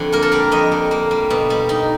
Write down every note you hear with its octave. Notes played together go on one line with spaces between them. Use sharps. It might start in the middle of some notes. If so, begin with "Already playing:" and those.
Already playing: F2 D3
A#3 A#4
A4
G3 A#4
F2 D#5
D3
A#3
G3
B2
G3
D#4